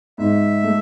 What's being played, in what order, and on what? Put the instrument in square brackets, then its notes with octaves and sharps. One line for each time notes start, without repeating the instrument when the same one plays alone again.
[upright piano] G#2 [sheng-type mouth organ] E5
[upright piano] A3